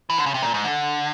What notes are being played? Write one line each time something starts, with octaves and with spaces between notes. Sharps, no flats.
E3
D3
C#3
C3
A#2
G#2
D3